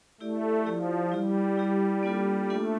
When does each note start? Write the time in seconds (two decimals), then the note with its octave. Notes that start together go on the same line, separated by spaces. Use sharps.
0.21 A3 E4 G4 D5
0.66 F3 E4 G4 D5
1.12 G3 E4 G4 D5
1.57 E4 G4 D5
2.03 A#3 D4 F4 A4
2.48 A3 A#3 D4 F4 A4